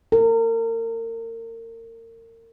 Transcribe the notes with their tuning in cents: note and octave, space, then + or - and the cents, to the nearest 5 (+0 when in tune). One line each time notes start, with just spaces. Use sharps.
A#4 -35